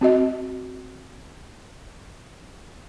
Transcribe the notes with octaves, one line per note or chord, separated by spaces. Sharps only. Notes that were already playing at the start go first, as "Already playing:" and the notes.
C4 F#4 D#5